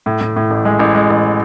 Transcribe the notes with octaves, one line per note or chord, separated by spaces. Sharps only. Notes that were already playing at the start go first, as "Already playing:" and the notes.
A2
A2
A2
A1
G#3
A1
G#3
A1